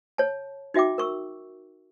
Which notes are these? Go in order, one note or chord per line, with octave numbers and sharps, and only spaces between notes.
C#5 A5
D#4 F#4 E5 G5 D6
A#4 C#6 E6